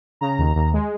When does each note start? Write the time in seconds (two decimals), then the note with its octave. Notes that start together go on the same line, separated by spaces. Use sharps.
0.21 C#3 A#5
0.38 D#2
0.56 D#2
0.73 G#3